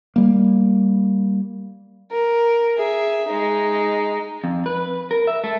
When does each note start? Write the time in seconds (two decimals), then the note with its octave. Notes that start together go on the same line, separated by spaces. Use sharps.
0.16 G3 A#3
2.11 A#4
2.77 G#4 E5
3.28 G#3 D#4
4.44 F2
4.66 B4
5.11 A#4
5.27 E5
5.44 A3